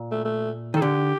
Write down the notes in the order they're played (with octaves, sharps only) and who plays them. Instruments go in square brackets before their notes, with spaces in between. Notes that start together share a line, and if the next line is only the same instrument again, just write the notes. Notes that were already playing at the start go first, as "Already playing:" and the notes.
Already playing: [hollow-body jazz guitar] A#2
[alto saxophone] A3
A3
[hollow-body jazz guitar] D#3 [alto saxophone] A4
[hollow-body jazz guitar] D3 [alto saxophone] G4